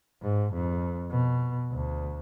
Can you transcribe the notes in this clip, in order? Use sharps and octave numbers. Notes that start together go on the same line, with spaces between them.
G#2
F2
B2
D2